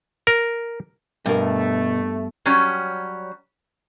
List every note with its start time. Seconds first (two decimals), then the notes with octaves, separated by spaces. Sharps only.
0.27 A#4
1.26 G2 B2 A3 A#4
2.46 F#3 G3 C#4